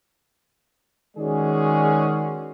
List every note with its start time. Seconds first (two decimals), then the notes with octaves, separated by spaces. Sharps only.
1.17 D#3 G#3 C#4 F#4 G#4 D5